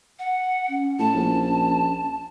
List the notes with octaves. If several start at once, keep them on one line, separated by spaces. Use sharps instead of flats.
F#5
C#4
A2 A5
A#1